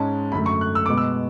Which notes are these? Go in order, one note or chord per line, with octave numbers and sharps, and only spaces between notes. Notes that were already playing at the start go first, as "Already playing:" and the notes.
Already playing: G#2 G#3 C#4 A5
F#2 D3 A3 B5
C#6
F#6
E6
B2 G#3 B3 D6
E6